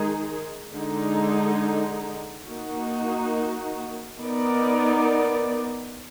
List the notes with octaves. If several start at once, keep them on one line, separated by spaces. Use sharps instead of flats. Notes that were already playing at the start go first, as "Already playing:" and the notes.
Already playing: D#3 G#3 D#4 G#4
D3 G#3 D#4
A#3 D#4 F#4
B3 D#4 A#4 D5